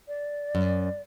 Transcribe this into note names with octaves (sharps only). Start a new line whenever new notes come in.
D5
F#2